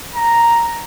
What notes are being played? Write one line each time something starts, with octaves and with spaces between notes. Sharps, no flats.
A#5